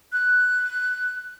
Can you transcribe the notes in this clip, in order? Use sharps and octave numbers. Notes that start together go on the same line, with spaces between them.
F#6